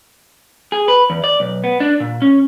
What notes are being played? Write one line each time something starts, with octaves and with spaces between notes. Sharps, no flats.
G#4
B4
E2
D5
B1
B3
D4
A#2
C#4